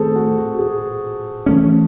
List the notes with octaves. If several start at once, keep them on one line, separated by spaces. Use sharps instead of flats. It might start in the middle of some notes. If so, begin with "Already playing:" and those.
Already playing: D#3 A3 C4 G#4 A4 C5
F#4
F#4
G#4
E3 A3 C#4